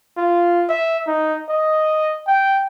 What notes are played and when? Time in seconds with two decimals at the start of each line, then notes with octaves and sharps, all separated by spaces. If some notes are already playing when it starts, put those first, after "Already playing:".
0.17 F4
0.69 E5
1.07 D#4
1.49 D#5
2.27 G5